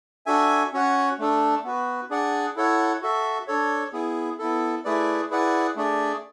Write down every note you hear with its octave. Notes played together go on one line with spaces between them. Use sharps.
D4 F#4 A4 E5 G#5
C#4 F#4 C#5 F#5
A3 D4 A4
B3 F#4 B4
D4 G#4 D5 F#5
E4 A4 C#5 F#5
F#4 A4 E5
D4 A4 C#5
B3 E4 G#4
B3 E4 A4
A3 E4 G#4 B4 D5
E4 G#4 B4 D5 F#5
A3 D4 G#4 D5